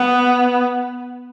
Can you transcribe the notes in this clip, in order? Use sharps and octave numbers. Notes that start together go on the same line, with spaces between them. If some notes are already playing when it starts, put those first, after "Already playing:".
Already playing: B3